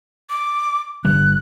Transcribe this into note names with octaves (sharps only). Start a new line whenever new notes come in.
D6
G1 D3 G3 F#6